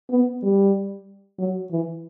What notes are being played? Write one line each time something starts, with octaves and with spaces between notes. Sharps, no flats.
B3
G3
F#3
E3